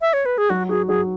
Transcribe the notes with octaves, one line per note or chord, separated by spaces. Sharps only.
E5
C#5
B4
G#4
F#3 F#4
F#4 G#4
F#3 G#4